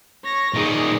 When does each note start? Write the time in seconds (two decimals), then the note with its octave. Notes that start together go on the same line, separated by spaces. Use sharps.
0.24 C#5 A#6
0.54 A#2 D#4 G#4